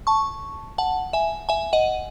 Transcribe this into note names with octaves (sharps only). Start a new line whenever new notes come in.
A5 C#6
F#5 A5
E5 G#5
E5 G#5
D#5 F#5